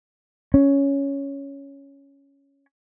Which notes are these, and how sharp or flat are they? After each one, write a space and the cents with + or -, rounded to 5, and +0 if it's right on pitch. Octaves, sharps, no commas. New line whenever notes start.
C#4 +5